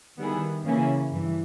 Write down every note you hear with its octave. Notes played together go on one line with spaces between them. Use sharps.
D#3 G3 B3 E4 G#4
C#3 E3 A#3 C#4 E4
G2 E3